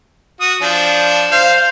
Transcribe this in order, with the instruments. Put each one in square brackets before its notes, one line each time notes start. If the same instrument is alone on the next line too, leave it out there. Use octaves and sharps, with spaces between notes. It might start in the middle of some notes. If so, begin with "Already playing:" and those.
[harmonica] F#4 D#6
F3 D4
[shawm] C5 [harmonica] F5